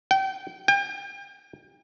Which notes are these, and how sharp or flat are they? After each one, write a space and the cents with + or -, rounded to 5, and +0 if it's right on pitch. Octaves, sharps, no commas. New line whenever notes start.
G5 -30
G5 +35